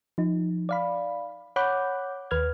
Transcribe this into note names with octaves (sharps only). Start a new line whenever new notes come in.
F3 D#4
D5 F5 B5
C#5 F#5 B5 D6 F#6 G6
D#2 B4 F6 G#6